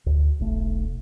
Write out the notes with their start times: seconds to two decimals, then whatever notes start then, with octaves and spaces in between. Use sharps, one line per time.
0.06 D2
0.39 E1 B1 A3